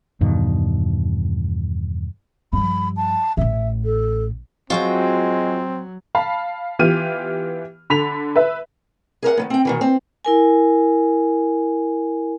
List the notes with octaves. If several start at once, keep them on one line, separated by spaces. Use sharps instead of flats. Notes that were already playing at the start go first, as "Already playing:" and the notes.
E2 G2 B2 D#3
G2 F3 B5
A5
A1 A2 E5
A4
F#3 G#3 C4 F4 F#4 G5
F5 A5 B5
E3 B3 F4 G4 F6 D#7
D3 B5 B6 F7
B4 E5
G#4 A#4 C5 F#5
D#3 F#3 B3
C4 G5
B2 D#3 E3
C4
E4 A#4 G#5